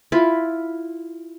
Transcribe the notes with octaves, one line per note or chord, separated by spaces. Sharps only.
E4 F4 B5